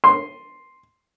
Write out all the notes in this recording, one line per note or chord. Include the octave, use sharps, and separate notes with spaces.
C6